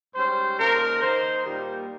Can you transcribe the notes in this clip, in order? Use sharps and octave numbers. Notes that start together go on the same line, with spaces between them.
G#2 G3 C#4 C5
C#3 F3 A#3 D#4 A#4
D#3 A#3 D#4 C5
A#2 G3 A#3 D#4